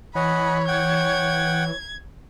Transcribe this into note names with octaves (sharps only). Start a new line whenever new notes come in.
E3 C#5 D#5 F#5 G#5 B5
F#5 G5 G#6